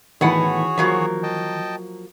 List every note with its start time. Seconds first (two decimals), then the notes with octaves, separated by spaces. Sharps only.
0.21 A2 D#3 E3 B3 F#4 G#4 C#5 F#5
0.78 F3 F#3 A#3
1.23 D#5 G5 A5